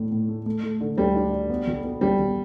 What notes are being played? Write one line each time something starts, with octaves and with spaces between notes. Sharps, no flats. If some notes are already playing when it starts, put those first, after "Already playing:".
Already playing: A2 A3 D4
A2
A3
A3
A3
D3
D2 G3
D4
D4
B3
B1
B3
B1 G3
B1